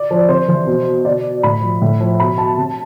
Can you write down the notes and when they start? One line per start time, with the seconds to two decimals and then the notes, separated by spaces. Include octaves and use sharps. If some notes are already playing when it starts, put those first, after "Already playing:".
Already playing: D5
0.11 F3
0.28 C3 C5
0.48 E3
0.67 B2
1.05 B2 D5
1.43 A2 B5
1.62 F3
1.82 A2
2.00 F3
2.20 B2 B5
2.38 A5
2.57 C3